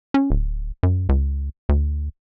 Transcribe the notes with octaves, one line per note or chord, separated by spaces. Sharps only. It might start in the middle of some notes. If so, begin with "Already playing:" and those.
C#4
D1
F#2
C#2
D2